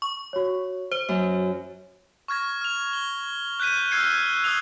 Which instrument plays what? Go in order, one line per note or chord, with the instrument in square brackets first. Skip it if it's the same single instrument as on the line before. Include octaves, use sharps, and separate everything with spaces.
[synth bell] C#6
[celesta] F#4 C#5
[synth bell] C5 [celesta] G7
[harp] F#2
[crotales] C#6 F6 G#6 A#6
F6 F7
G7
F#6 G6 B6 D#7
E6 F6 G6 G#6 C7 C#7
D#6 E6 F#6 F7